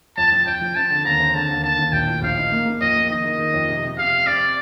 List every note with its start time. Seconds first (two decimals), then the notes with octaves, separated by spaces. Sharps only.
0.17 F2 A5
0.32 F3
0.46 F2 G5
0.62 F3
0.76 C4 A5
0.91 D3
1.05 D#2 A#5
1.20 C4
1.34 D3 A5
1.49 D#2
1.64 D#2 A5
1.79 D#2
1.93 A#1 G5
2.07 A2
2.22 A#1 F5
2.37 D#4
2.52 A#3
2.66 A#3
2.81 F2 D#5
2.96 A#3
3.10 D#3 D#5
3.24 D#3
3.39 D#3
3.54 F2
3.69 C3
3.83 C3
3.98 C3 F5
4.12 C3
4.27 C4 D5